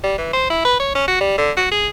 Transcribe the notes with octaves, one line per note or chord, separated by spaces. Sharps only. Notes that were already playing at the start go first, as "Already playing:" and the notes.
G3
E3
C5
E4
B4
C#5
C#4
F#4
G3
D3
F#4
G#4